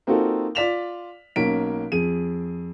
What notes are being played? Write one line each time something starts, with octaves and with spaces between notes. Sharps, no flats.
A#3 C4 D#4 F4 F#4 A4
F4 D5 B6 E7 F7
B1 A#3 C#4 B6 D7
F2 G#4 D#7